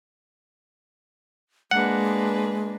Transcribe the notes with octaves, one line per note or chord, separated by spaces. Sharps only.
G#3 A#3 D4 B4 F#5